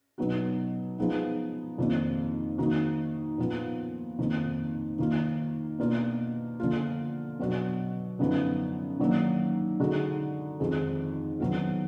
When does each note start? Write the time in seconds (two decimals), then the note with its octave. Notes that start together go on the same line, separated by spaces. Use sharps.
0.18 B2 F#3 B3 D#4 F#4
0.98 F3 G#3 B3 D#4
1.78 F2 D#3 A#3 D4
2.58 D#3 A#3 D#4 F#4
3.38 A#2 F3 B3
4.19 F2 D#3 A#3
4.99 D#3 A#3 F4
5.79 B2 A#3 D4 F4
6.60 D3 F3 A#3 F4
7.39 B2 F#3 D4 F#4
8.19 F#2 D3 F3 B3 D#4
8.99 D#3 F#3 A#3 D4
9.80 D3 G#3 D#4 F#4
10.60 F2 D#3 G#3
11.40 D#3 F#3 B3 F4